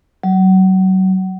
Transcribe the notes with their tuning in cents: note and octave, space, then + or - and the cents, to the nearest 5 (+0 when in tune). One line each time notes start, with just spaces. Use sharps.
F#3 +30